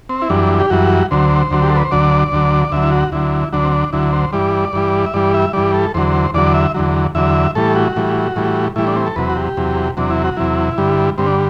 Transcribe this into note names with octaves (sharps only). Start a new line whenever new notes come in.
C4
E4
F#2 E3 G3 D4
G4
F#2 E3 G3 F#4
D2 D3 F#3 C5
D2 D3 F#3
G4
A4
B4
C5
D2 D3 F#3 D5
D2 D3 F#3
D5
D2 D3 F#3 E5
E4
F#4
D2 D3 F#3 E4
D2 D3 F#3 D4
C4
D4
D2 D3 F#3 E4
C5
G2 E3 G3 D5
G2 E3 G3
E5
G2 E3 G3 D5
E5
G2 E3 G3 D5
A4
E2 D3 F#3 C5
E2 D3 F#3 D5
E5
E2 D3 F#3
E2 D3 F#3 E5
A2 E3 G3 A4
F#4
A2 E3 G3
A2 E3 G3
A2 E3 G3 E4
D4
C4
A4
E2 C3 F#3 B4
F#4
G4
E2 C3 F#3
E2 C3 F#3 D4
E4
F#4
E2 C3 F#3 E4
G2 D3 G3
G2 D3 G3 C4
D4